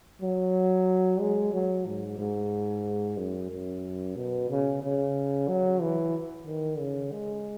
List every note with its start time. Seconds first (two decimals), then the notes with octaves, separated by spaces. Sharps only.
0.22 F#3
1.20 G#3
1.54 F#3
1.87 G#2
2.19 G#2
3.18 F#2
3.51 F#2
4.16 B2
4.49 C#3
4.83 C#3
5.48 F#3
5.81 E3
6.47 D#3
6.79 C#3
7.12 G#3